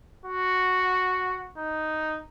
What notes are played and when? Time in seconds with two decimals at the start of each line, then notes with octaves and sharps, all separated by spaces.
0.26 F#4
1.58 D#4